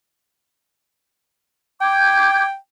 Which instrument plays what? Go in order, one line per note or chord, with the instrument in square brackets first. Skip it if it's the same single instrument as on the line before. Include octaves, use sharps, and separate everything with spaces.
[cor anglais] G5 [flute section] D6 G6 G#6